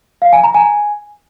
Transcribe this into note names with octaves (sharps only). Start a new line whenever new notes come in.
F5
G#5
A#5
G#5